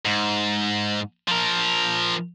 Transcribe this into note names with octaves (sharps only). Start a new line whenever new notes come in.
G#2
F3 A#4